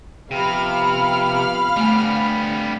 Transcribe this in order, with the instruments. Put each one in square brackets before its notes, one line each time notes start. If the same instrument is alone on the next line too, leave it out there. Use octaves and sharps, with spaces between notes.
[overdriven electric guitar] C3 [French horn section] F3 B3 G4 [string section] F5 B5 F6
[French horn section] D3 C4 D4 [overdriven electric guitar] G3 B3 [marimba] A3 G#5